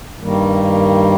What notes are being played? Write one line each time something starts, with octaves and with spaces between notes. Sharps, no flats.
G2 D#3 G3 A#3